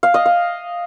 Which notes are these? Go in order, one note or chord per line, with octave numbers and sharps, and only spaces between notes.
F5
D#5
F5